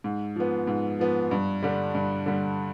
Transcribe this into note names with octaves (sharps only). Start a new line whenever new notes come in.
G#2
F3 B3
G#2
F3 B3
G2
D3 G3
G2
D3 G3